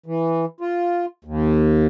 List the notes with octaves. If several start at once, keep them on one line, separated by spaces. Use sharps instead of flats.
E3
F4
D#2